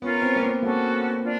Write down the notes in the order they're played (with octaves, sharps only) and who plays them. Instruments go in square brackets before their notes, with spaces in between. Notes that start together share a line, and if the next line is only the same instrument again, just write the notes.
[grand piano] B3 [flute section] C#4 F4 A#4
[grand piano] C4
A#3
B3
[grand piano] A#3 [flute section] C#4 F#4 A4
[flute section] D4 F4